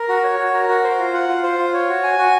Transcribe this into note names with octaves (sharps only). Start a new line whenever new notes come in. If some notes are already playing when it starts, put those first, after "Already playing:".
Already playing: A#4
F#4
C#5
F#4
A#4
F#4
C5
F4
F#5
F4
C5
F4
C#5
F#4
G#5
F#4